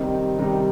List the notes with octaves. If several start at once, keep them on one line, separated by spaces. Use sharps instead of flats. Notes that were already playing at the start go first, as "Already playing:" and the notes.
Already playing: C3 D#3 G3 C4 D#4
C3 D#3 G3 C4 D#4